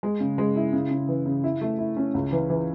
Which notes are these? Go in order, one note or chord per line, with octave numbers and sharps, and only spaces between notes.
G#3
C#3
G#3
E4
C#3
C#3
E3
C#3
E4
A3
E4
C#4
C#2
E3
E3